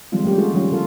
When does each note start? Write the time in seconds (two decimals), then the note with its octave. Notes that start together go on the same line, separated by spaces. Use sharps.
0.12 D#3 F3 G3 G#3 C4 F4
0.24 G3 A3 A#3 C#4 G4
0.37 G#3 A#3 F4 F#4 G#4 A4
0.53 D#3 F3 G3 C#4 F4
0.72 D3 A#3 D4 F4 A4